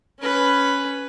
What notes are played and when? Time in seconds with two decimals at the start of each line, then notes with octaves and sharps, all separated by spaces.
0.20 C#4 B4